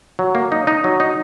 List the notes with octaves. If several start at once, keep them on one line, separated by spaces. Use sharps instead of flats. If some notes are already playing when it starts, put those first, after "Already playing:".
F#3
A#3
D#4
D#4
F#3
D#4